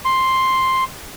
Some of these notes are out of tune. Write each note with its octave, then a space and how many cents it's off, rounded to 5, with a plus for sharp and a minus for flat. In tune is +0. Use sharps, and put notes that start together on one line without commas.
C6 +5